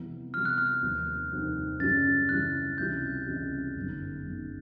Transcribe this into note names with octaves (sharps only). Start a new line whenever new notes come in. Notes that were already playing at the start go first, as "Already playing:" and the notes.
Already playing: F2 C3 E3 G3 B3
F2 C3 E3 G3 B3 F6
F#6
F6
F1 D#2 D#3 G3 C4
F1 D#2 D#3 G3 C4
F#2 C#3 E3 G3 A6
F#2 C#3 E3 G3 F#6
C#2 C3 E3 G3 G6
C#2 C3 E3 G3
G1 F#2 D#3
G1 F#2 D#3